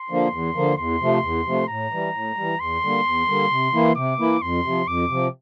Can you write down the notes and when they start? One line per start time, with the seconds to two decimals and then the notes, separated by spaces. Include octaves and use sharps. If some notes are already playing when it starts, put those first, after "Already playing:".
Already playing: C6
0.09 D3 F3 A#3
0.32 E2
0.55 D3 F3 A#3
0.78 E2 C6
1.01 C3 F3 A3
1.23 E2
1.46 C3 F3 A3
1.68 A2 A#5
1.92 E3 G3
2.14 A2
2.36 E3 G3
2.60 E2 C6
2.82 D3 G3 A#3
3.05 E2
3.27 D3 G3 A#3
3.50 C3
3.73 E3 A#3 E4
3.96 C3 D6
4.19 E3 A#3 E4
4.42 F2 C6
4.64 C3 F3
4.87 F2 D6
5.09 C3 F3